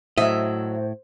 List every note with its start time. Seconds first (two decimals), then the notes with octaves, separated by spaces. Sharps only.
0.18 A2 F#3 C5 D#5 E5